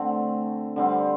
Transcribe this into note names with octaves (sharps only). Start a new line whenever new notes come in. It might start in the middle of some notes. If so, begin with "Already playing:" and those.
Already playing: D3 A3 C4
D3 G3 C4